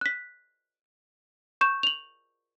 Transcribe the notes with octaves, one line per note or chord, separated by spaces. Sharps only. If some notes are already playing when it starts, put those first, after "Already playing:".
F#6 B6
C#6 G6 E7
F7 F#7